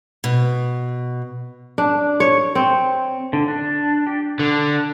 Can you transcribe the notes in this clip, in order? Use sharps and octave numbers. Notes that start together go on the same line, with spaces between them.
B2
D4
C#5
C4
D3
D4
G4
D3